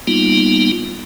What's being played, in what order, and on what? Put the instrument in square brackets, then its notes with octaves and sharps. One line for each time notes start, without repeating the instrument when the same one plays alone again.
[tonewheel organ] G3 A#3 B3 D#4 F4